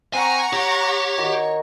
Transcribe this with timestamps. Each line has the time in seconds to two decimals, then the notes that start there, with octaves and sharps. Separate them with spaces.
0.14 C4 F#5 G#5 A#5 C#6
0.53 G4 C#5
1.18 D#3 F#4 A#4